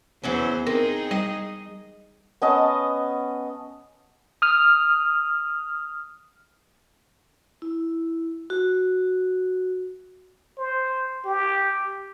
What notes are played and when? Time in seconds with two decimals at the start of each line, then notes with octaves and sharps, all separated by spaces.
0.24 E2 E3 F#3 B3 C#4 C5
0.67 C4 D#4 G#4 A#4
1.11 G3 D#5
2.42 B3 C#4 D#5 A5
4.42 D#6 F6
7.62 E4
8.50 F#4
10.58 C5
11.25 G4